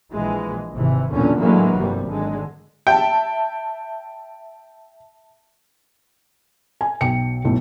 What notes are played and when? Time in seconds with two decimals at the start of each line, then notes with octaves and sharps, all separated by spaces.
0.13 A#1 E3 G#3
0.74 G#1 C3 E3
1.09 B1 E2 A#2 D3 C#4
1.39 A2 D3 E3 F#3 G#3 A#3
1.76 G1 C3 G3
2.08 G#1 D3 G#3
2.87 E5 G5 A5
6.81 G#5
7.01 B1 G5 C#7
7.45 B1 A2